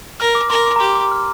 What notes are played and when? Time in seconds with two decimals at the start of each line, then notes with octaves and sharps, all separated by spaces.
0.20 A#4 F6
0.35 D6
0.50 A#4 C6
0.66 D6
0.76 A#5
0.80 G4 C6
0.95 D6
1.11 F6